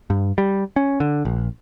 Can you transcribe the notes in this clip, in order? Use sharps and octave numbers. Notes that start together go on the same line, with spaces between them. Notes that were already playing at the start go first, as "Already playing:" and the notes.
G2
G3
C#4
D3
A#1